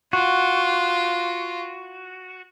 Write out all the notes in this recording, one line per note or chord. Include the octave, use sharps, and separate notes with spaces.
F4 F#4